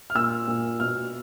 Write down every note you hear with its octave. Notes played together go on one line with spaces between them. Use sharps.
F6
A#2 E6
A#2
B2 F6